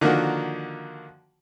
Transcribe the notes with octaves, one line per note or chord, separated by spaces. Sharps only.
D3 D#3 F3 A#3 F#4